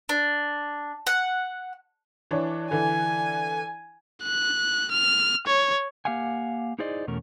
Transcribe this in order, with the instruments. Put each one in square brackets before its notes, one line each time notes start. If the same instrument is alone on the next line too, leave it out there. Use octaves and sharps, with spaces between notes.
[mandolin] D4
F#5
[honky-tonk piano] E3 D4 C#5
[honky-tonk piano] D3 E3 [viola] G#5
[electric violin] F#6
F6
C#5
[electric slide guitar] A#3 G4 F5 F#5 G#5
D#4 E4 G#4 C5 D5 D#5
E2 B2 A3 C#4 A#4